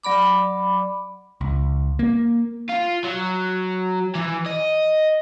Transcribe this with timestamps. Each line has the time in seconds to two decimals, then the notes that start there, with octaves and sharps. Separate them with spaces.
0.03 F#3 D5 B5 D6
1.41 C#2
1.99 A#3
2.70 F4
3.04 F#3
4.15 E3
4.46 D#5